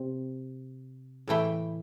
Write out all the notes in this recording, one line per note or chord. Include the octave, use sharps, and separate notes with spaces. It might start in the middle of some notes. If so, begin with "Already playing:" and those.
Already playing: C3 C4
A2 E3 A3 E4 G5